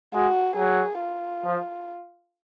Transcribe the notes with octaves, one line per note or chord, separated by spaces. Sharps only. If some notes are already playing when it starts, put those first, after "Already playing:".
G#3 F#4
F#3 G#4
F4
F3